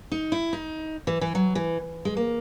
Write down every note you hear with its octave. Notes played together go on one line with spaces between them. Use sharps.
D#4
E4
D#4
E3
E3
F#3
E3
G#3
A#3